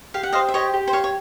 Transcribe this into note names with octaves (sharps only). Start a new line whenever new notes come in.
G4 F5
F#5
C5 D#5 F5
E5
G4 C#5 D#5
G4
C5
C#5 F5
C#5